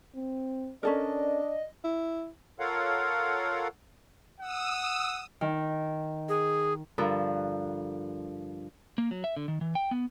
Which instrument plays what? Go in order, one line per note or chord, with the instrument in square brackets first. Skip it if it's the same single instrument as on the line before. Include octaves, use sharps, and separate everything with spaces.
[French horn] C4
[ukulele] C#4 A4 A#4 [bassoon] D4 [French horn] D5 [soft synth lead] D#5
[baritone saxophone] E4
[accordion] F4 A4 A#4 C#5 F5 F#5
[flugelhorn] F#5 [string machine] D#6 E6
[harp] D#3
[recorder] G#4
[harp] G2 D3 F3 A4 A#4
[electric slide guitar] A#3
F#3
E5
D3
D#3
E3
G5
B3